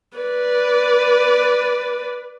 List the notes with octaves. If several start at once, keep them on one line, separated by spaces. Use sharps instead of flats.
B4 D5